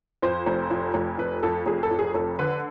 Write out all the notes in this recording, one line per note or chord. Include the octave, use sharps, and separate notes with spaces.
F2 C5
F1
F2
F1
F2 B4
F2 A4
F1 G#4
A4
F2
G#4
F1 A4
D3 B4